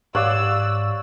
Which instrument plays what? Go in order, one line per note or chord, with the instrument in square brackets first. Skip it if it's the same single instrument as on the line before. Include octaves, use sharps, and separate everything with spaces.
[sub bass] G#2 [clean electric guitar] G4 F5 [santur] C#5 D5 F#5 [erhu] E6